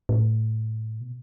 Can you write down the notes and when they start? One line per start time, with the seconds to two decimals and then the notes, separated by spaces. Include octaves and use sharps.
0.09 A2
1.00 B2